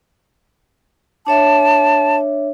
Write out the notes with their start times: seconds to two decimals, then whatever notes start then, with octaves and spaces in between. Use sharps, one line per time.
1.27 D4 C#5 E5 A5